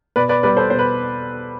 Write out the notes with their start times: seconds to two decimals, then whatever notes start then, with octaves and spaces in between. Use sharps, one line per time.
0.16 B2 B4 D5
0.29 B4 D5
0.43 G3 B3 B4 D5
0.57 A4 C5
0.70 B2 C5
0.79 B4